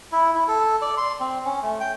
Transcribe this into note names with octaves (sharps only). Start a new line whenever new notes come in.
E4
E4
A4
D5
C6
C4
C#4
A3
G5